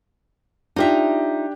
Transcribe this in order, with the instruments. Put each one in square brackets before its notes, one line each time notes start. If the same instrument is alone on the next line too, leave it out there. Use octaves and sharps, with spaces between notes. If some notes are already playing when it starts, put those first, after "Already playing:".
[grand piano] D4 G4 [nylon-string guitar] D#4 F4 E5